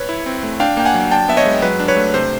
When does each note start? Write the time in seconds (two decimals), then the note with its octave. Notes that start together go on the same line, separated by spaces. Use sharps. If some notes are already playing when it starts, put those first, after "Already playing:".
Already playing: B4 C#5
0.09 E4
0.26 C4
0.43 A3
0.60 D4 F5 G5
0.77 A#3 G5
0.85 F#5 G#5
0.94 F#3
1.11 D4 G5 A5
1.28 B3 E5
1.37 C#5 D#5
1.45 G#3
1.62 F#3 B4
1.80 D4
1.88 B4 C#5
1.97 A3
2.14 C3 C5